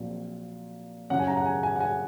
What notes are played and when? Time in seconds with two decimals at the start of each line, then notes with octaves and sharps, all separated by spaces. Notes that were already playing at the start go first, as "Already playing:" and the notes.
Already playing: A#1 A#2 F#3 C4
1.10 F#2 C#3 F#3 C#4 F#5
1.19 G#5
1.27 A#5
1.37 F#5
1.45 G#5
1.63 G#5
1.76 F#5
1.80 G#5